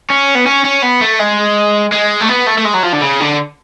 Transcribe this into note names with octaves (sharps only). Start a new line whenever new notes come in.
C#4
B3
C#4
C#4
B3
A3
G#3
G#3
A3
B3
A3
A3
G#3
F#3
F3
D3
C#3
D3